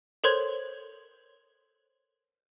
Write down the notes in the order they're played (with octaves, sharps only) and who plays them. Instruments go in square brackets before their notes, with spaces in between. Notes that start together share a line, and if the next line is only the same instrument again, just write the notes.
[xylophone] A4 A#4 C5 C#5 C6 G#6